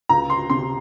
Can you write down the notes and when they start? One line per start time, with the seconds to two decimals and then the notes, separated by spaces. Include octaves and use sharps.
0.09 C#2 A#5
0.30 C6
0.50 C3 C6